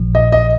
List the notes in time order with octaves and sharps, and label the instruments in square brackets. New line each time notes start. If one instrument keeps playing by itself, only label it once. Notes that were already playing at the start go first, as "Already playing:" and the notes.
Already playing: [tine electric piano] A#1 A#2 F3
[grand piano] D#5
D#5